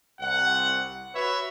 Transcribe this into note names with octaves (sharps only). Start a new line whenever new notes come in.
C2 F#5
F#4 B4 C#5 E5